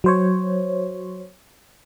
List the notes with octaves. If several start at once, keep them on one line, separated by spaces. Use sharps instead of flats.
F#3 C5 C#5